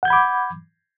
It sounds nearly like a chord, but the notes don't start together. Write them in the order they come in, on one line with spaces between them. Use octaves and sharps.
F#5 G6 G#6 B5 D6